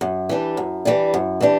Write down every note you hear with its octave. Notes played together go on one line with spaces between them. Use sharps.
F#2
E3 G3 D4
F#2
E3 G3 D4
F#2
E3 G3 D4